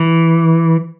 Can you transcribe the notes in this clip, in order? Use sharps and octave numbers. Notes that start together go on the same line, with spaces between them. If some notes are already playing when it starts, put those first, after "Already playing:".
Already playing: E3